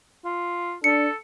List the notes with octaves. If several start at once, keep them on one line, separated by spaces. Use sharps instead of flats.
F4
D4 A4 C#7